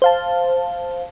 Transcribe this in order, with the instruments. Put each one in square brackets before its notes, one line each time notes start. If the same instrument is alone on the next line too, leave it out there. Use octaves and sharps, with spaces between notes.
[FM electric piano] C5 F5 A5